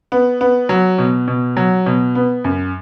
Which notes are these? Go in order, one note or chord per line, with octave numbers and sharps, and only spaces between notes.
B3
B3
F#3
B2
B2
F#3
B2
B3
F#2